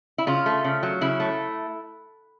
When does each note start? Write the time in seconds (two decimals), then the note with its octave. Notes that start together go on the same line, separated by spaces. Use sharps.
0.18 E4
0.27 C#3 F4
0.46 A3
0.64 C#3
0.83 F#3
1.01 C#3 E4
1.20 A3